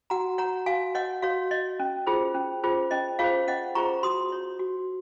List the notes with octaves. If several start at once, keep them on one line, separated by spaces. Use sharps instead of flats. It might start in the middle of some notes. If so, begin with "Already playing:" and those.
F#4 F#5 A#5
C#5 F#5 A#5
F#4 F5 G#5
C#5 D#5 F#5
F#4 C#5 F5
C#5 D#5
C#4
F4 G#4 C5
C#4
F4 G#4 C5
C#4 D#5
F4 G#4 C5 C#5 F5
C#4 D#5 F#5
F4 G#4 C5 A#5 C#6
F#4 C6 D#6
C#5
F#4